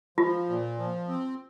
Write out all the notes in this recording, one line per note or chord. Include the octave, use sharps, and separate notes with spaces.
F3 F4
A#2
F3
C4